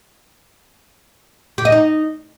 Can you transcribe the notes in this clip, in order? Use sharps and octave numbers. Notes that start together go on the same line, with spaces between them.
G4
D#5
D#4